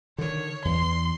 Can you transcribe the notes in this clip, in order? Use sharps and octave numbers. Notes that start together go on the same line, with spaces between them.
D3 D#3 C#5
E2 C6